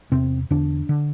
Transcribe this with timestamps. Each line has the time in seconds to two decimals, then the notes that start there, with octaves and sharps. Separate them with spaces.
0.12 E2 C3 C4
0.50 E2 D3 D4
0.89 D3